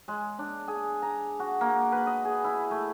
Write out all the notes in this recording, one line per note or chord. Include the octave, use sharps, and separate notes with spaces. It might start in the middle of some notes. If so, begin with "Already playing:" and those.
G#3
D4
G#4
A#5
F#4
A#3
B4
D#5
G#4
E4
A3